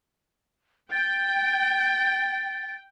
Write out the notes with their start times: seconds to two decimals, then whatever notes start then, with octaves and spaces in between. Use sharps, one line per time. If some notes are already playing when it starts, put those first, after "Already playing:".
0.92 G5 A6